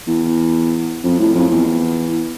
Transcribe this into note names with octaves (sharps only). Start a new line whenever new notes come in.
E2
F2
A2
F2
E2